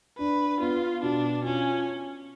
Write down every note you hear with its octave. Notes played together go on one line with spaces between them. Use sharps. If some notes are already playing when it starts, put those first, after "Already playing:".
D4 B4
B3 F4
B2 D4
C#4 F4